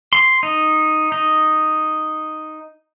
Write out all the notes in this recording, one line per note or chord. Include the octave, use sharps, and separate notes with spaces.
C6
D#4
D#4